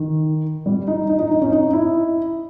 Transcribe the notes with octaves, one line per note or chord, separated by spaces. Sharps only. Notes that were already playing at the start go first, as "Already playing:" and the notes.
Already playing: D#3
G3
D#4
D#4
D#4
D#4
C#4
D#4
E4